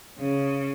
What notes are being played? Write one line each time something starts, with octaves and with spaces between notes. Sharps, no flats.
C#3